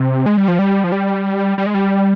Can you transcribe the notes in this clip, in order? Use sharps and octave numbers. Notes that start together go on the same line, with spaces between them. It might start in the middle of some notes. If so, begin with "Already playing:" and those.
Already playing: C3
G#3
G3
F3
G3
F3
G3
G3
G#3
G3